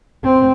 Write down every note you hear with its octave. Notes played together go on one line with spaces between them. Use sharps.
C4